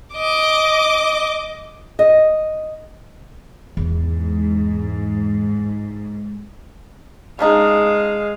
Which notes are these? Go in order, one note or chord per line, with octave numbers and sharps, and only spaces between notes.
D#5 D6
D#5
E2 G#2
C#3 G#3 D4 D#4 F5